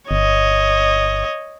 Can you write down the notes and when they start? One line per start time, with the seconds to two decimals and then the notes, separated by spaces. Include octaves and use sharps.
0.11 G1 C#5 D#5